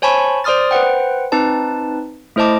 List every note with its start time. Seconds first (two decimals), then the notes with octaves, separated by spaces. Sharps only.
0.02 C5 C#5 G#5 A5 B5 C#6
0.44 C5 D5 C6 D#6 F6 A6
0.71 B4 C5 F#5 G5
1.32 C4 D#4 B4 A5
2.36 A3 E4 C5 D#5 A5 D6